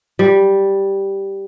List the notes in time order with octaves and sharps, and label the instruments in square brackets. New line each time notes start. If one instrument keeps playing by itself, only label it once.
[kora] G3